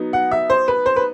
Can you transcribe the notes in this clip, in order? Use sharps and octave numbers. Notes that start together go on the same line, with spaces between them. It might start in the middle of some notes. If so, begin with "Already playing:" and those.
Already playing: F#3 B3 D#4
F#5
E5
C5
B4
C5
B4